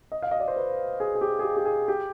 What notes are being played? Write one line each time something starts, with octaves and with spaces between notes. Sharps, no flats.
D#5
F5
D#5
D5
C5
B4
G#4
G#4
G4
G#4
G4
G4
G#4
G4